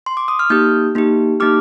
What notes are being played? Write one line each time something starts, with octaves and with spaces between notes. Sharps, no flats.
C6
D6
D#6
F6
A#3 D#4 G4 D#6 G6
A#3 D#4 G4
A#3 D#4 G4 D6 F6